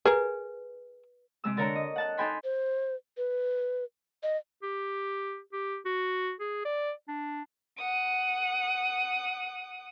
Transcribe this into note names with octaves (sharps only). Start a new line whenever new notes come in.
G#4 A#4 B4
C3 G#3 E6
D3 A4 A#4 C#5 A#5
D#5
F#5 A5 F#6
D#4 A4 G5 G#5 B5 C6
C5
B4
D#5
G4
G4
F#4
G#4
D5
D4
F#5 D#6